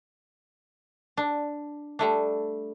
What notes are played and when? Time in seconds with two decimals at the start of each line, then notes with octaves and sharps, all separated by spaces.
1.17 D4
1.99 G3 A3 D4